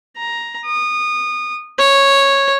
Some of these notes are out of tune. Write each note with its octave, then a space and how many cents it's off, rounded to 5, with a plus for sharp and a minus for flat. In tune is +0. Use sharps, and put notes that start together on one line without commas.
A#5 +10
D#6 -25
C#5 -10